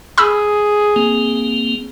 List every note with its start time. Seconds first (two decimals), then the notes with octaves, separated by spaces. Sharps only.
0.18 G#4 B5 E6
0.96 A#3 C4